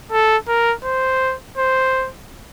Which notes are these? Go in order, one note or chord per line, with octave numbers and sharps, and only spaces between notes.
A4
A#4
C5
C5